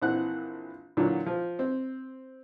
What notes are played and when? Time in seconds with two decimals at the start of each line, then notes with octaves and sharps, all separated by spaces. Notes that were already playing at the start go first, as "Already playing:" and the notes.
0.01 A#1 E3 C4 F#5 F#6
0.97 A#2 D3 E3 F#3 A#3
1.26 F3
1.59 C4